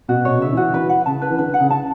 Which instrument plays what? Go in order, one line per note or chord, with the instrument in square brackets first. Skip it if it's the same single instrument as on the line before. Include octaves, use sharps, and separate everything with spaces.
[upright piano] B2 [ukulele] F#4
[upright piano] B2 [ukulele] C#5
[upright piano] C#3
[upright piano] D3 [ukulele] E5
[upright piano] E3 [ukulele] F#4
[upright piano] E3 [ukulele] B4
[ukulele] F#5
[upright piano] C#3 [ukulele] A5
[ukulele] B4
[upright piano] E3
[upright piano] D3 [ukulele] B4
[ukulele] F#5
[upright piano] C#3
[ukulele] A5